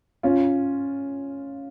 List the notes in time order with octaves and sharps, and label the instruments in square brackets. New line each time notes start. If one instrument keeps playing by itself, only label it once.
[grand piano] C#4 F4